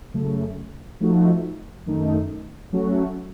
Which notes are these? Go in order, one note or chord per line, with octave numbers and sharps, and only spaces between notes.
F#2 C#3 A3
F3 A3 D#4 F#4
F#2 D#3 A3 D#4
F#3 A3 C#4 F#4